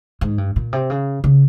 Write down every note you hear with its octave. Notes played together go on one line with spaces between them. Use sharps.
G#2
G2
A#2
C3
C#3
C#3